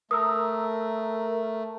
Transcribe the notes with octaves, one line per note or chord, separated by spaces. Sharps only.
A3 A#4 D#6 E6